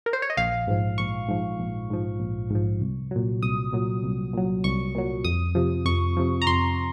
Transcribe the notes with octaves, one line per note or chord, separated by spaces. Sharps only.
A#4
C5
C#5
D#5
A#1 F5
G#2 F3
A#1 C#6
G#2 F3
A#1
G#2 F3
A#1
G#2
F3
C2
A#2 F#3
C2 D#6
A#2 F#3
C2
A#2 F#3
C2 C#6
A#2 F#3
F2 D#6
C3 F3
F2 C#6
C3 F3
A#5
F2 C6